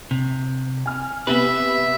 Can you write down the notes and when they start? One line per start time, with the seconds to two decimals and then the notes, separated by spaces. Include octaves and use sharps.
0.11 C3
0.86 G#5 F6
1.27 C3 B3 B4 E5